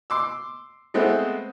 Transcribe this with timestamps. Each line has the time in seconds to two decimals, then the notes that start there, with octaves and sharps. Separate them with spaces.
0.10 C6 D6 E6
0.94 G#3 A3 B3 C4